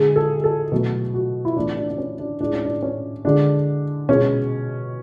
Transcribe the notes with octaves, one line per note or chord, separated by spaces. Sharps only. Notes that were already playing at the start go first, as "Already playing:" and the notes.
Already playing: D3 G#3 G#4
A4
A4
B2 F#3 A3
F#4
E4
A2 E3 A3 D4
D4
D4
C#4
D4
A2 G#3 D4
C#4
D4
C#4
D3 G#3 D4
B2 G#3 C#4